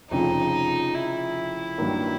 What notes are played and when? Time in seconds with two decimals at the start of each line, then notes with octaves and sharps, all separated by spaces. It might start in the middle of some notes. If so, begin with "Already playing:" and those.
0.10 F1 F2 C#3 F3 D#4
0.94 E4
1.78 G2 D#3 F#3 A#3